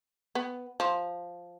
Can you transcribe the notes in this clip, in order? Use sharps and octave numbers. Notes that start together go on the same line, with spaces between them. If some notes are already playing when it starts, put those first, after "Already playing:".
B3
F3